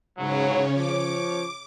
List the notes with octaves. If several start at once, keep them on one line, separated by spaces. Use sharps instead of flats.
G#2 C#3 E3 F#3 C#4
F3 C#5 D6